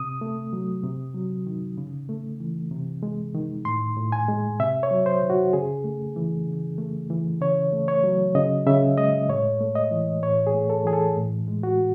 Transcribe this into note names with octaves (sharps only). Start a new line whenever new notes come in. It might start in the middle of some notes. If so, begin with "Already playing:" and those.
Already playing: C3 D#6
A3
F#3
C3
F#3
D#3
C#3
A3
E3
C3
G#3
D#3
A2 C6
A2
G#5
G#3
C3 E5
C#5
F#3
C5
D#3
F#4
C#3 G#4
A3
E3
C#3
A3
E3
C#3 C#5
A3
C#5
F#3
C#3 D#5
C#3 E5
G#3 D#5
A2 C#5
A3
D#5
E3
A2 C#5
G#4
A3
A4
E3 G#4
A4
A2
G#3
F#4